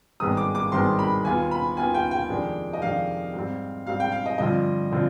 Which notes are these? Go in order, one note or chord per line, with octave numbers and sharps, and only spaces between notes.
G#1 G2 D#3 G#3 B3 D#6
D6
D6
G#1 G2 D#3 G#3 B3 C6
B5
D#2 D#3 B3 F4 G#5
B5
D#2 D#3 B3 F4 G#5
G5
G5
F2 C3 D#3 G#3 D4
D#5
F2 C3 D#3 G#3 D4 F5
G#2 G3 C4
G#2 G3 C4 F5
G5
F5
D#5
G2 D3 F3 C4 F4 D#5
D3 F3 C4 F4